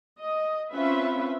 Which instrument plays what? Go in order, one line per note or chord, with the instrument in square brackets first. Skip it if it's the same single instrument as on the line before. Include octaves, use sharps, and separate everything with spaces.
[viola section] D#5
C4 C#4 F4 B4 E5